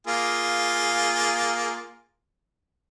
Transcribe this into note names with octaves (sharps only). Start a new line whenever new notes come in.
A#3 F4 G#4